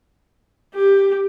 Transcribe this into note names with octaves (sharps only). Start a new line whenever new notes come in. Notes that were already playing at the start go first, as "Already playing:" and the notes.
G4